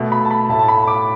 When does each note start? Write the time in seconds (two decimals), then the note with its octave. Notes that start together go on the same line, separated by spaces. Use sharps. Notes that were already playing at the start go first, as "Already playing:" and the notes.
Already playing: B2 A3
0.12 B5
0.25 A5
0.31 B5
0.49 A2 A3 A5
0.59 A5
0.68 B5
0.88 D6